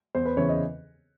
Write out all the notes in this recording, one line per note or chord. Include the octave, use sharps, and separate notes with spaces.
E2 C5
B4
C#3 E3 C#5
D#5